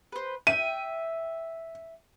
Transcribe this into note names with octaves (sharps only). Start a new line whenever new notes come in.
B4 C5
E5 G5 D#7